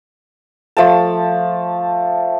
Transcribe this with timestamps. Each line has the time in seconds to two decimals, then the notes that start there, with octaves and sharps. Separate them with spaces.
0.77 F3 A3 A5